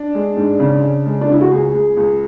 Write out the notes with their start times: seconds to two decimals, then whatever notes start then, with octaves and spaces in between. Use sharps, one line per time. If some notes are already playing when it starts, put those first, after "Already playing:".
Already playing: D4
0.15 G#3
0.37 G#2
0.60 C#3
0.82 C#3
1.06 G#3
1.21 D4
1.29 C#3 E4
1.41 F#4
1.51 C#2 G#4
1.74 C#2
1.97 C#2